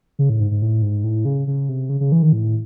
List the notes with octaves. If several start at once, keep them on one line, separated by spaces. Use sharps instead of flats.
C#3
A2
G#2
G#2
A2
G#2
A2
C#3
C#3
C3
C#3
C#3
E3
D#3
A2